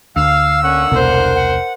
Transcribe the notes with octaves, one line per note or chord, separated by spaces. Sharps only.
D2 F5 E6
D3 A#3 C#4 F#5
E1 C2 B2 A#4 C5
F#5